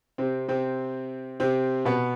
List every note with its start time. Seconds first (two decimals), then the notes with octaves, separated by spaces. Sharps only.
0.18 C3 C4
0.48 C3 C4
1.40 C3 C4
1.85 B2 B3